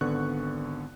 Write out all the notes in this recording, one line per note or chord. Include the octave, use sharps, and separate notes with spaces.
G#1 D3 B3 C#6 F#6